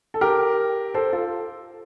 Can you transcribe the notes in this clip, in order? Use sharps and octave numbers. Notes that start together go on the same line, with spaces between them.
A4
G4 A#4
A4 C5
F4 A4